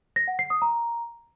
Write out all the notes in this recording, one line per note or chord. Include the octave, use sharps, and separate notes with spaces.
A#6
F#5
C7
D#6
A#5